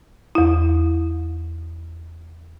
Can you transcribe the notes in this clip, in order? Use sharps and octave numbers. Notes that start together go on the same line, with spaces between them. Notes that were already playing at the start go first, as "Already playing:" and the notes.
E2 E4